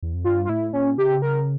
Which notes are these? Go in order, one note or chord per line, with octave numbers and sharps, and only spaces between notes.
E2
F2
G2 F4
F4
A2 E4
A#2 C#4
C#3 G4
A#4